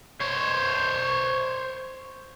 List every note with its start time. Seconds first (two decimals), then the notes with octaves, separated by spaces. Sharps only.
0.21 C5 C#5